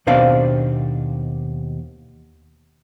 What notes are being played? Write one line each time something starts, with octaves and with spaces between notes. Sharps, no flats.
D#2 B2 C4 D4 C5 F5